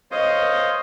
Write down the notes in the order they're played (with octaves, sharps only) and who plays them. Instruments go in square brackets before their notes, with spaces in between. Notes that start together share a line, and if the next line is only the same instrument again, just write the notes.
[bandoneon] C5 C#5 F5 [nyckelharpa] D#5